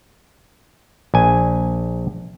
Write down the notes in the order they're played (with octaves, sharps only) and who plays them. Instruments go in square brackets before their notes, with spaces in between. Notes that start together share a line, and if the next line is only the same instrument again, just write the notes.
[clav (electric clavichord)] A#1 G#5